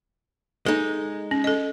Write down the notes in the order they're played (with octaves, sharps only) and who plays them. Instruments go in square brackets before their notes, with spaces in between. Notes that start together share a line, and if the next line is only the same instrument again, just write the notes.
[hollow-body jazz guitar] G#3 D#4 [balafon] A4
[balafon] C#4
A4 D#5